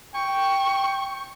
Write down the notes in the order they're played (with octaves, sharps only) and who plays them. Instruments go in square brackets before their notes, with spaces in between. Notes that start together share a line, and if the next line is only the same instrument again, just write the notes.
[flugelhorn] G5 [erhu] C#6